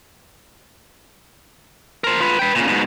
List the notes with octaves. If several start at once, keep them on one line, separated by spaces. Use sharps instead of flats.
A#4 C5
F4 B4
B4 G5
A#2 C#3
G#2 B2